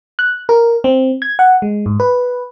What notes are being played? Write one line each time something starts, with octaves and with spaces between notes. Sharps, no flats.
F#6
A#4
C4
G#6
F#5
G#3
G#2
B4